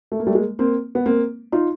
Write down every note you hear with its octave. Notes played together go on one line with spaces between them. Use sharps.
A3
A#3
G3 A3
G#3 A#3
A#3 C4
B3
A#3 C4
D#4 F4